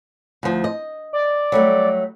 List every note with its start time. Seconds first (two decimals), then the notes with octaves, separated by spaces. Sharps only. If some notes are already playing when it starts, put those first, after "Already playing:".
0.43 D2 F3
0.64 D#5
1.13 D5
1.52 F#3 G3 A3